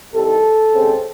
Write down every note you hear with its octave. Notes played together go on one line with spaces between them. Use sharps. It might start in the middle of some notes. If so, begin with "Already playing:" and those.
C2 C3 D#3 A4
D#2 C#3 G#3 C4